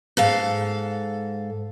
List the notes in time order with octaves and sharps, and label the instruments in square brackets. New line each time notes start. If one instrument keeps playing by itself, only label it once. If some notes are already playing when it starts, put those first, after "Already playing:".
[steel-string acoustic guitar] G#2 A4 F5